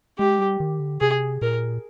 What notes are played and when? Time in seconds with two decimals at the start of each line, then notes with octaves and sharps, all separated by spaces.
0.19 G#3 G4
0.39 G3
0.60 D#3
0.80 D3
1.01 C3 G#4
1.42 A#2 A#4